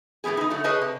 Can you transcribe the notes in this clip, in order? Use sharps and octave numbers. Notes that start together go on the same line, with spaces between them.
A2 E3 G3 B3 G#4
D#4 E4
D3 F#3 A3
G#4 B4 C#5 D#5 A5
C3